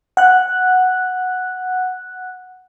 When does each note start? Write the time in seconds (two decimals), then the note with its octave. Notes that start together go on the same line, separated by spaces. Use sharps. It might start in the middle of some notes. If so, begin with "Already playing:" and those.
0.17 F#5 F#6